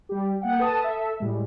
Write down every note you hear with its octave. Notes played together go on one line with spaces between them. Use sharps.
G3 G4
A#3 F#5 G5
A4 B4 A5 D#6
A4 E5
A2 G3 G#3